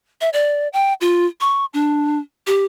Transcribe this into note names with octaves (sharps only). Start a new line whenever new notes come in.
E5
D5
G5
F4
C#6
D4
G4